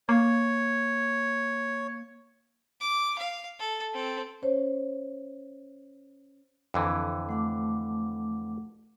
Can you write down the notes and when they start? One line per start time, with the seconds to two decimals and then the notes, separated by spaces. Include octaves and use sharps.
0.09 A#3 C#5
2.81 D6
3.19 F5
3.60 A4
3.94 C4 A4
4.42 C#4 C5 C#5
6.74 F2 D3 E3
7.29 A3 F#5 D6